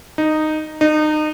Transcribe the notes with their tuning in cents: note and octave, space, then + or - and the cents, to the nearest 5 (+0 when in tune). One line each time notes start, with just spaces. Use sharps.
D#4 -10
D#4 -30